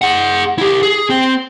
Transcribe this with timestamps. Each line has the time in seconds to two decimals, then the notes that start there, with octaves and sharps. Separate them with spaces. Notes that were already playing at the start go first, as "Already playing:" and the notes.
0.02 G#4 F#5
0.58 E4 G4
0.83 G#4
1.09 C4